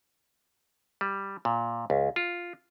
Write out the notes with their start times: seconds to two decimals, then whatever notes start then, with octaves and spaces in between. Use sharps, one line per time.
1.01 G3
1.45 A#2
1.90 C#2
2.16 F4